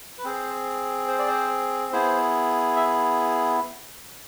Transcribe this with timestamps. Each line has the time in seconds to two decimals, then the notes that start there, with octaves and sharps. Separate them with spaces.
0.18 B4
0.24 C4 G#4 C5
1.08 C5
1.19 D5
1.28 C5
1.92 B3 E4 G#4 C5
2.76 E5